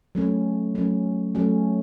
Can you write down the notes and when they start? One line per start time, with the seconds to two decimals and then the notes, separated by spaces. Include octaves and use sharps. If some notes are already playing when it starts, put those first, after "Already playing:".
0.15 F#3 A3 C#4
0.75 F#3 A3 C#4
1.35 F#3 A3 C#4